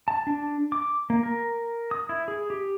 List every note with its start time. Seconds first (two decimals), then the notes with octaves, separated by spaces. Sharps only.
0.08 A5
0.27 D4
0.72 D6
1.10 A#3
1.23 A#4
1.91 D#6
2.09 E4
2.28 G#4
2.50 G4